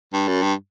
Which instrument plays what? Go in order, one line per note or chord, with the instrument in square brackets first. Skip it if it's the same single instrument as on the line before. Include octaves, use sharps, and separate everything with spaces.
[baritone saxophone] G2
F#2
G2